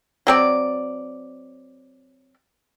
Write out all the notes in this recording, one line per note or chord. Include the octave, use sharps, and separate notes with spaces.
F#3 C4 D5